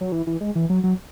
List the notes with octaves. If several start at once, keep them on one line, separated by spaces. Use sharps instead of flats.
F#3
E3
E3
G#3
E3
F#3
F#3